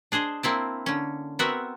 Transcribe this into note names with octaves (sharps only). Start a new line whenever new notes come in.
D4 G#4 C5 D#5
A#3 C4 E4 A5
D3 C#4
B3 C4 F#4 A#4 E5